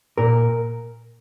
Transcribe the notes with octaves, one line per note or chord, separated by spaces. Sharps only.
A#2 A#4